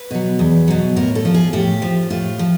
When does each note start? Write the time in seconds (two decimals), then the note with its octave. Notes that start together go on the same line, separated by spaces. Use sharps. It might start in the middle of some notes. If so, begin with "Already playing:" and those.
Already playing: B4
0.11 B2 F#3
0.39 E2
0.68 B2 F#3
0.96 A2 A#4
1.15 A4
1.25 F3
1.34 G#4
1.53 A2 G4
1.82 F3
2.10 A2 F4
2.39 F3